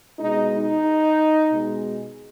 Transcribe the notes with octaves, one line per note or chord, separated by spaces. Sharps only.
B2 G#3 D#4
D#4
B2 G#3